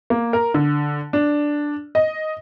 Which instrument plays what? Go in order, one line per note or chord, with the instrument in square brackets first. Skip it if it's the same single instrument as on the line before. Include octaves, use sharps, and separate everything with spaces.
[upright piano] A#3
A#4
D3
D4
D#5